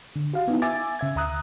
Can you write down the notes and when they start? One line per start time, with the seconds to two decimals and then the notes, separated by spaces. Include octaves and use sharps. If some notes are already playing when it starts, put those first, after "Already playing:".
0.16 D3
0.34 F#4 G4 F5
0.48 B3 D#4 E4
0.62 E5 G#5 D6 A6
0.99 C#3 E5 G#6
1.16 D2 E5 A#5 D#6 F#6